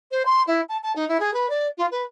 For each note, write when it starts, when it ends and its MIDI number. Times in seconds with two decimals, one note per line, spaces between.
0.11 0.23 72
0.25 0.43 84
0.47 0.61 64
0.69 0.77 81
0.83 0.92 81
0.95 1.07 63
1.08 1.18 64
1.20 1.33 68
1.33 1.49 71
1.49 1.67 74
1.77 1.86 65
1.91 2.02 71